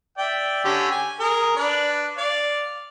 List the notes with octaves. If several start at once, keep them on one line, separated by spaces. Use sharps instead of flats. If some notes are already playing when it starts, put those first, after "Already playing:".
D5 E5 G5
D3 C#4 G4
G#5
G#4 A#4
D4 B4 D5
D5 F5